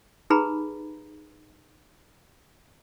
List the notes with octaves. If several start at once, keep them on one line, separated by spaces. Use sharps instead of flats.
D#4 G4 G#4 B4 A#5 B5